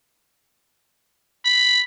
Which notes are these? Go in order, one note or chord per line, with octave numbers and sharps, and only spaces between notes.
B5